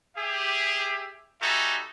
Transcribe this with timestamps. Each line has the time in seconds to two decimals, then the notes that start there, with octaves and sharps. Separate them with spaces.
0.16 G4 G#4 E5
1.41 G3 D#4 F#4 A4 E5 G#5